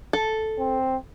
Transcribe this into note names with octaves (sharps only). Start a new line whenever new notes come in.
A4
C4